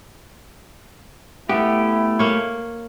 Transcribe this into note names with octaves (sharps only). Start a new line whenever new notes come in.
A3 B3 E4 G4
A#3 C#5